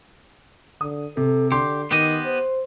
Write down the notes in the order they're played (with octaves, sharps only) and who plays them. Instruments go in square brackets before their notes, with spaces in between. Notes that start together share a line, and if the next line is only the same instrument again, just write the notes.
[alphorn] D3 [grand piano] D#6
[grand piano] C3 [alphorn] A4
[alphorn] D3 [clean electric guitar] G4 [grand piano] C6
[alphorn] D#3 [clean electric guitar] B3 G4 D#5
[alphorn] C5